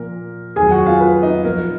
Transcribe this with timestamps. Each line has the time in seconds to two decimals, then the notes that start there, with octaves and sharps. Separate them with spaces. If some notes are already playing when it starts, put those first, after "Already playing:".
Already playing: A#2 F3 A#4
0.56 F2 D#3 F#3 G#4 G#5
0.71 F#4 F#5
0.86 F4 F5
1.00 B4
1.23 D#4 D#5
1.45 A#2 F3 A#4